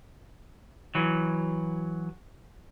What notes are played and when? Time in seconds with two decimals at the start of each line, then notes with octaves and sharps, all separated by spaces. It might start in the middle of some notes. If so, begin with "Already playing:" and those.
0.95 E3 F#3